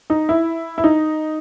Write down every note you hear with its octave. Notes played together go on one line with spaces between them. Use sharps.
D#4
E4
E4
D#4